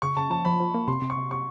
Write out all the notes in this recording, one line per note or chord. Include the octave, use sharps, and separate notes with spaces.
C#3 C#6
C#3 A5
F3 A5
F3 B5
F3
A#3
C3 C6
C3
C#6
C3
C3 C#6